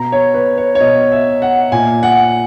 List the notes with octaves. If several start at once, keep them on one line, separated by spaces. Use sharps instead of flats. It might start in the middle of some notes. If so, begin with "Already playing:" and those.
Already playing: B2 A#5
C#5
B4
C#5
C#5
B2 D#5
E5
F#5
A#2 G#5
F#5